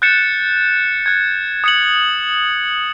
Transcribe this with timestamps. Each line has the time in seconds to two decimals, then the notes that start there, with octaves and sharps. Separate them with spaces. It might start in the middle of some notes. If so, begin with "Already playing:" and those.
0.02 F#6 G6 A6 C#7 E7
1.06 F#6 G#6
1.64 D#6 C#7 F#7